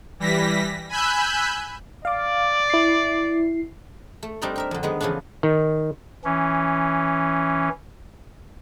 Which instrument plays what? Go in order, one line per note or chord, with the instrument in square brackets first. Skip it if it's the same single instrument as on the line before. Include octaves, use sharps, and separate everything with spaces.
[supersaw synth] E3 G3 A#6 B6
G#5 B5 E6 F#6 G6
[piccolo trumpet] D5 [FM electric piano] F5 D6
[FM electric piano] E4 C7
[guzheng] A3
G3 C4 D4 D#4 A#4 D5
G4 A#4 E5
F2 D3
D#3 G#3 B3
C#3 E3 F3 A3 D4
[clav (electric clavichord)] D#3
[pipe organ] E3 C#4